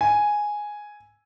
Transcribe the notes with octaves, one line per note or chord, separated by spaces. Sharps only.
G#5